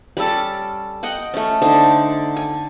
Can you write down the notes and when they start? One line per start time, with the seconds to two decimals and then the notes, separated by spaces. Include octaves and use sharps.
0.17 G3 C#4 A4 D6
1.03 D#5 F#5 G5
1.34 A3 C#4
1.62 D3 D#4 C5
2.37 G#5